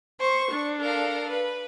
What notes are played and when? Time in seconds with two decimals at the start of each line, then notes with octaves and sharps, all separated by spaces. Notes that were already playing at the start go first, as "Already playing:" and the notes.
0.20 C5 C#6
0.52 D4
0.81 A4 A#4 F5
1.32 B4